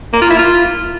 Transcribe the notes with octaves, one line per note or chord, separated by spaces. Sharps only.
A#3
F4
E4
F4